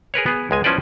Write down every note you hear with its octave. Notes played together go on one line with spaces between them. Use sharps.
G#4 A#4 B4 C#5
B3 G#4
C#2 G#3 G#5
F3 C#4 E4 B4 C5 D5